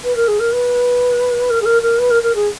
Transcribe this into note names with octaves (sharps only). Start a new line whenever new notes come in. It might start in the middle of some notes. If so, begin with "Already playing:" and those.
B4
A#4
G#4
A#4
B4
A#4
G#4
A#4
A#4
B4
A#4
A#4
G#4